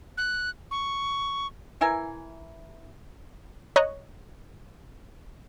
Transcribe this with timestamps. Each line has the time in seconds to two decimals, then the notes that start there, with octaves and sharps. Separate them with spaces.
0.18 F#6
0.71 C#6
1.81 E3 E4 A#4 G#5
3.76 C#5 D#5 A#5 C#6 F#6